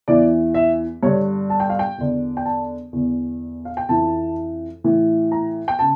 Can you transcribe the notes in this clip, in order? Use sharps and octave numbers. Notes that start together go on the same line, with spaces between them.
E2 E3 D5
E5
G2 D3 C#5
A5
G5
F5
G5
E2 D3
G5
A5
E2 D3
F5
G5
F2 E3 A5
A2 E3
A#5
G5
C#3 A5